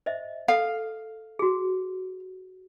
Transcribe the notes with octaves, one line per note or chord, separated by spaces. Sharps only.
C5 D#5 E5
A4 F5
F#4 G#4